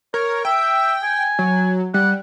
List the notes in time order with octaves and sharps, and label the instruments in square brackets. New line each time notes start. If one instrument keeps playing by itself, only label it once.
[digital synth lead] A#4 [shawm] C#5
[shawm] E5 [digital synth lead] G5
[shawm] G#5
[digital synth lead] F#3
[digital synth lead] G3 [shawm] F#5